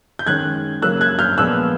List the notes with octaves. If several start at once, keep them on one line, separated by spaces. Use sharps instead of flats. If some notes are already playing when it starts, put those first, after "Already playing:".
G6
D#3 G#3 C#4 F#6 G#6
C#3 F#3 A#3 C#4 E6 F#6
F#6 G#6
F6 G6
A#2 F3 G#3 B3 E6 F#6